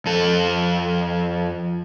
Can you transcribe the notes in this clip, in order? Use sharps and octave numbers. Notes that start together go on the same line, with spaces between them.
F2 A4